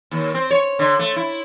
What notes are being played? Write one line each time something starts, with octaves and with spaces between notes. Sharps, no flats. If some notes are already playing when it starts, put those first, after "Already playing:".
D#2
C4
C#5
D3
A3
E4